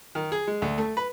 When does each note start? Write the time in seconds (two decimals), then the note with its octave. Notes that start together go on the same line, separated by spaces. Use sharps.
0.15 D#3
0.32 G#4
0.47 G#3
0.62 D2
0.78 A3
0.97 B4